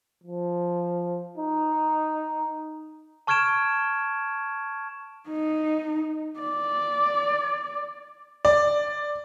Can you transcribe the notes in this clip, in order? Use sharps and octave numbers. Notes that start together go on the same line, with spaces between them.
F3
D#4
A5 C#6 F6 G#6 D7 E7
D#4
D5
D5